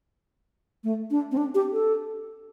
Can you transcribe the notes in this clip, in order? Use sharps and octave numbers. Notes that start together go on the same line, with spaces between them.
A3
D4
C4
D4
G4
A4